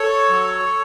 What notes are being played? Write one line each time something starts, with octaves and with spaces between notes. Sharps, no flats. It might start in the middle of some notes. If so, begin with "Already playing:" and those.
Already playing: A4 C#5
F#3